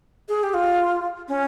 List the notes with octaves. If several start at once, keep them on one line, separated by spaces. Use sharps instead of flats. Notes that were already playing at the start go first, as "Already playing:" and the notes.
G#4
G4
F4
C#4